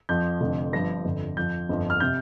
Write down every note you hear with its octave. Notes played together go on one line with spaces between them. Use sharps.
F2 F3 G6
F1 F2 D3 F3
G1 G2 F3 A#6
G1 F2 D3
F2 F3 G6
G1 F2 F3
F6
C3 G6